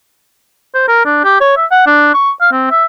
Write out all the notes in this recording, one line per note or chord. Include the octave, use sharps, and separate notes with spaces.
C5
A#4
D4
G4
C#5
E5
F#5
D4
C#6
F5
C4
E5